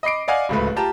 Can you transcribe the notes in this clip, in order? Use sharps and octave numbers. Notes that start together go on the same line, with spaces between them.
D#5 B5 D6 C7 D7
D5 D#5 F5 F#5 G#5
D1 C#2 A3 B4
F4 G4 A5 A#5